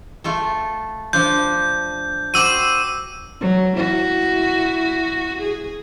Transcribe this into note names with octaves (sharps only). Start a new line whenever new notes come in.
A3 F4 A4
F3 D4 F4 G6
F#4 C5 G5 D6 E6 D#7
F#3
E4 F#4
G#4